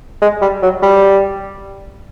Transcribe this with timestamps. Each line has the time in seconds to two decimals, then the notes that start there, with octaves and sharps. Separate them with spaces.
0.22 G#3
0.42 G3
0.62 F#3
0.82 G3